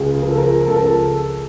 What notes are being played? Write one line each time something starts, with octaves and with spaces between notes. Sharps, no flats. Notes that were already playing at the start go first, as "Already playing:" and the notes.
Already playing: C#2 C#3
F3 A#4
A4
A#4
C#2 A4
A#4
A4